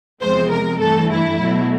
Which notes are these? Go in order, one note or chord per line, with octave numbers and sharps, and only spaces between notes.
E2 C3 F3 G#3 C5
A#4
G2 E3 A3 A4
E4
B2 F#3 A3